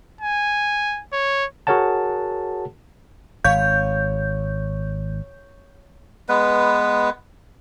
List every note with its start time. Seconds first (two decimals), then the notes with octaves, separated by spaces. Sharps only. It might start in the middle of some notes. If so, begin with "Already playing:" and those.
0.21 G#5
1.13 C#5
1.67 F#4 G#4 A#4 C#5 F#5 A5
3.45 G#1 C#5 F5 G6
6.29 G#3 B3 B4